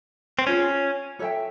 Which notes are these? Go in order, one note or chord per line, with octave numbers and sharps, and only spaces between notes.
C4
C#4 F4 G#4 C#5
A4 C#5 E5 G5